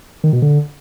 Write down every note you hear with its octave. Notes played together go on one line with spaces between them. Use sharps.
D#3
B2
D3